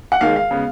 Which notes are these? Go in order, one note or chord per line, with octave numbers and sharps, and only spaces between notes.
F#5
D#2 D#3 G#3 F5
F5
C#3 G#3 B3